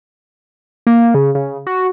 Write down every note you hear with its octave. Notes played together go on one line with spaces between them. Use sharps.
A#3
C#3
C#3
F#4